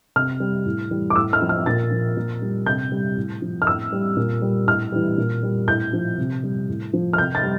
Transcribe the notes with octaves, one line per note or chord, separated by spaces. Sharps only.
C3 F6
G3
A2
E3 G3
D6
A2 E6
F6
F3
F6
A#2 A6
F3
A#2
G3
C3 G6
G3
A2
F3
F6
A2 E6
G3
A#2
G3
A2 F6
E3 G3
A#2
G3
A2 G6
F3
C3
G3
A2
F3
F6
C3 G6
A6
G3